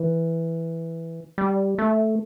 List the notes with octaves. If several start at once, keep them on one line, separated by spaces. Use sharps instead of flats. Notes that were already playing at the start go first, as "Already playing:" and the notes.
Already playing: E3
G3
A3